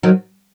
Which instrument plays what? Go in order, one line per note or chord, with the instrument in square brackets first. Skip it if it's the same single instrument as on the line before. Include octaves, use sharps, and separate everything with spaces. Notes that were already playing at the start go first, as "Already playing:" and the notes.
[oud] D#3 F#3